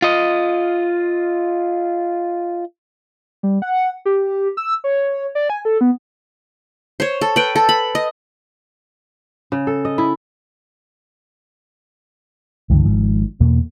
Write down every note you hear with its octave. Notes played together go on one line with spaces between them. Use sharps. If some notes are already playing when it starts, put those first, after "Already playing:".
F4 D#5
G3
F#5
G4
E6
C#5
D5
G#5
A4
B3
C5 C#5
A4
B4 G5
A4
B5
D#5
C#3
A4
D#5
E4
C#2 G2 D3 E3
G#1 G#2 F3
E2 B2 A#3